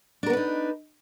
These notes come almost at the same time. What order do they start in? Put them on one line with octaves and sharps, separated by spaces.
D4 A#4 B3 B4 D#4